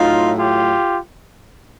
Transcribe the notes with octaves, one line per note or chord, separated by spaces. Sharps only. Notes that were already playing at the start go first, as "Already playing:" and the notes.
Already playing: A2 F#3 D#4 F4
F4 G4